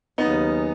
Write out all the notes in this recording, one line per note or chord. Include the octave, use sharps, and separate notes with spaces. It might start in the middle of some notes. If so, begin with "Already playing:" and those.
D#2 C#3 F#3 B3 C#4 D#4